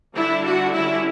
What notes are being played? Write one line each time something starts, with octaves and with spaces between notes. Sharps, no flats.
D3 G3 D4 E4
F#4
D3 G3 C#4 E4